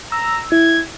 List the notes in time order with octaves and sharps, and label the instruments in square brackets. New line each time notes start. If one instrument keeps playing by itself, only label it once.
[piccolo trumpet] A#5 [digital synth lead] E6
[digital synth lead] E4 [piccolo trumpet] G#6